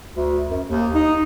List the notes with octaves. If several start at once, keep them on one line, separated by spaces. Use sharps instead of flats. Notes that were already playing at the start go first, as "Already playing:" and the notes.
D2
F#2
D#2
D#4